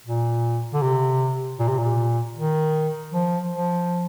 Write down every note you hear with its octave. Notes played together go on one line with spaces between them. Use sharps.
A#2
D3
C3
A#2
C3
A#2
D#3
F3
F3